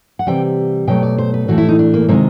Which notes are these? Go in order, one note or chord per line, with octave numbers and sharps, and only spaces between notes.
F#5
C3 E3 G3 G5
B2 F#3 A3 G5
D5
C5
B4
A2 E3 A3 F#4
E4
D#4
D4
A#3
C3 D#3 G#3 A#3